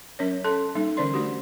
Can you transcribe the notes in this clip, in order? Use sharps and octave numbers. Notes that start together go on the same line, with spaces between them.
F#3 C#4 A#4 C#5
A4 A5 C6
G3 A#3 D#4 A4
D3 E3 C#4 C5 D5 C6
A3 D4 F#4 G4